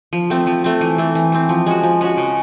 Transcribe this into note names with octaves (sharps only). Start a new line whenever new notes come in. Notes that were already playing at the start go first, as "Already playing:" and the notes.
F3
A3 C4
F3
A3 C4
E3
A3 C4
E3
A3 C4
F3
G#3 C#4 F#4
F3
G#3 C#4 F#4
C#3